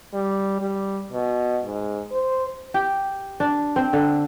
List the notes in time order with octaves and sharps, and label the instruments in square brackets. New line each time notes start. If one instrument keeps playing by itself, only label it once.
[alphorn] G3
G3
B2
G#2
C5
[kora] G4
D4
C4
D3